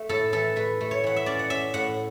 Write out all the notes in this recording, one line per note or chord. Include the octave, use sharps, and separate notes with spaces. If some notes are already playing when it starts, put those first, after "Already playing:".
Already playing: A3
A2 A4
E3 A4
A3 B4
A3
C#5
E3 F#5
E5
C#4 D5
F#5
C#4 E5
A2 F#5